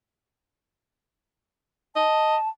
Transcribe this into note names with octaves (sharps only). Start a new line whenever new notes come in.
D#5 A5